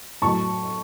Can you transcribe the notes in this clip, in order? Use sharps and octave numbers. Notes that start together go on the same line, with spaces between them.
A2 F#3 A5 C#6